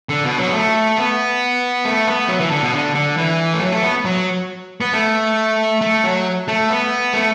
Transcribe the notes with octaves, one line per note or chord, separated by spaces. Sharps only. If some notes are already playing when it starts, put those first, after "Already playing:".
D3
B2
F#3
B3
A3
B3
A3
B3
F#3
E3
D3
B2
D3
D3
E3
A3
F#3
A3
B3
F#3
B3
A3
A3
F#3
A3
B3
A3